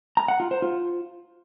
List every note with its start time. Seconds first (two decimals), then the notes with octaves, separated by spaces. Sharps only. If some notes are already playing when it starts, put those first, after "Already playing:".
0.17 A#5
0.28 F#5
0.40 F4
0.51 C5
0.62 F4